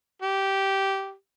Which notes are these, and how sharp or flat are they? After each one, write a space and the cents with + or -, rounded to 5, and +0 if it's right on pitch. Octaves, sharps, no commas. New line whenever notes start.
G4 -10